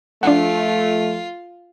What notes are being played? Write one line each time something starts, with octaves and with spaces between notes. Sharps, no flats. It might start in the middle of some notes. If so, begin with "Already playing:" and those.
F3 A3 D4 F4 F#5